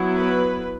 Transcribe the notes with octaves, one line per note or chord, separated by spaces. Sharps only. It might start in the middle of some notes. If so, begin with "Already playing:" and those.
Already playing: F#3 B3 E4
B4